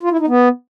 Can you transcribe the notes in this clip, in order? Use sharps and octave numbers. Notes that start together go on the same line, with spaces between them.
F4
E4
D#4
B3